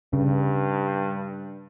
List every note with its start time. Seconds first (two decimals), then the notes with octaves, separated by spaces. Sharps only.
0.13 G2 C#3